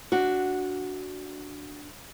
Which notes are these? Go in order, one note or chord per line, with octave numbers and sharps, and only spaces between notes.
D4 F#4